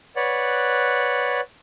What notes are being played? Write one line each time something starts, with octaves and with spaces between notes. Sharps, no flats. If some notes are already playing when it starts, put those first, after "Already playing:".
B4 C#5 D5 F#5